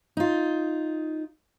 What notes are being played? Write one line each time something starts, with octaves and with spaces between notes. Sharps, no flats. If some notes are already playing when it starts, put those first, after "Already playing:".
D#4 F4